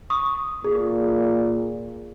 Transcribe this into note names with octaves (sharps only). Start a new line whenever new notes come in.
C#6 D#6
A#2 G#4